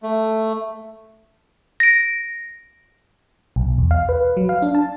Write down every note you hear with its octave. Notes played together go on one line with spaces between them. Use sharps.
A3
A#6 D7
B1
E2
F5
B4
F#3
F5
D4
A5